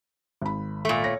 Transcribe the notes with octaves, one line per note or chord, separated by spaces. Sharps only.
G#1 B5
A#2 A3
C#5 A#6